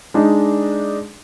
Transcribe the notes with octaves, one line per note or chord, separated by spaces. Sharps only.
G#3 D4 D#4